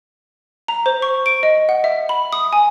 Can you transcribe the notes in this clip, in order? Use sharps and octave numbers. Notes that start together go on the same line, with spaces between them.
A#5
C5
C#6
D7
D#5
F#5
E5
B5
D#6
G#5